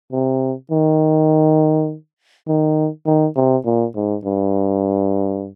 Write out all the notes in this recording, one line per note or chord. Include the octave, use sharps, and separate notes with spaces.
C3
D#3
D#3
D#3
C3
A#2
G#2
G2